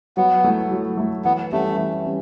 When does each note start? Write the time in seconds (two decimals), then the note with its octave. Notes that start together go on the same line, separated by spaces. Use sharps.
0.17 F#3 B3
0.44 A3 E4
0.71 F#3
0.97 A3 E4
1.25 E3 B3
1.52 G3 A3 C#4 G4 B4
1.78 E3
2.06 G3 C#4